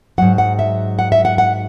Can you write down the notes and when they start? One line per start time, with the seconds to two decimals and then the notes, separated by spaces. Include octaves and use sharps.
0.18 G#2 F#3 F#5
0.38 F#5
0.59 E5
0.99 F#5
1.12 E5
1.25 F#5
1.38 F#5